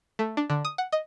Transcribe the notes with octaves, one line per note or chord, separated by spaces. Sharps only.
A3
D4
D3
D#6
F#5
D#5